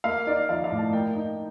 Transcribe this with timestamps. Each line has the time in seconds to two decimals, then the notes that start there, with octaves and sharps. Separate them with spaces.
0.04 A#3 F5
0.27 D#4 D5
0.49 F3 F5
0.64 F5
0.71 A2
0.79 A5
0.92 A#3 G5
1.15 D#4